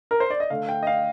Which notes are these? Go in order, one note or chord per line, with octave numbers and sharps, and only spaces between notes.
A#4
C5
D5
D#5
D3 A3 F5
G5
D#5
F5